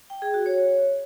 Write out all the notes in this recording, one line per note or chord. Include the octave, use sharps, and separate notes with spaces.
G5
G#4
F#4
C#5